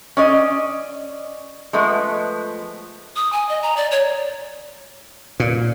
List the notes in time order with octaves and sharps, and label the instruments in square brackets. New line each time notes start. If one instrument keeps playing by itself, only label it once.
[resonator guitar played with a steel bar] C#4 D5 D#5
F3 G#3 A3 B3
[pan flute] D#6
G#5
D#5
A#5
D5
C#5
[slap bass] A#2